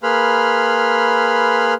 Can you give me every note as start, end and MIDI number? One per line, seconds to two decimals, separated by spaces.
0.03 1.74 58
0.03 1.74 68
0.03 1.74 71
0.03 1.74 83
0.03 1.74 84
0.03 1.74 89